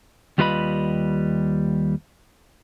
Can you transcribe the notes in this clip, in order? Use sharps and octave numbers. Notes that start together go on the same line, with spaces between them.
D#2 G3 F4 B4 D#5 B5